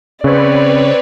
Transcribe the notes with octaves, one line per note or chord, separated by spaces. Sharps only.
C#3 C4 B4 C#5 D5